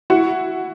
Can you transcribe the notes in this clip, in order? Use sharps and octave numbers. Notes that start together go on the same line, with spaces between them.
E4 F#4